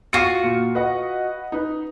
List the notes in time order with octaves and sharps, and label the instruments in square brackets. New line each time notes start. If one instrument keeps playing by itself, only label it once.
[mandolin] F4 F#4 [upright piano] C#6 C7 C#7
[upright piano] A#2
B4 D#5 F#5
D#4 B4